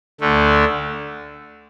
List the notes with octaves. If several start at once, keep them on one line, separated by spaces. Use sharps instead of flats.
D2 D3 A3